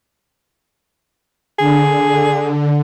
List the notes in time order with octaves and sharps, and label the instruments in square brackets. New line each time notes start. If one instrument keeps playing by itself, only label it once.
[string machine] D3 [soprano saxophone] G#4